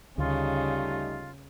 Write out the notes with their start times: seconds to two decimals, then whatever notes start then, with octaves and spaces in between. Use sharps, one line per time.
0.18 D2 C#3 G3 A3 D#4 F4